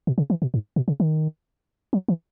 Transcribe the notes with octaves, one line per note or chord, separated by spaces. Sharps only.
B2
C#3
E3
B2
G#2
B2
C#3
D#3
F#3
E3